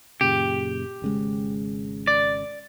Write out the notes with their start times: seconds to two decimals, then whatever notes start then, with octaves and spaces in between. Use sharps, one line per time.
0.21 F#2 A#2 C#3 G4
1.02 G#1 C#3 G#3
2.07 D5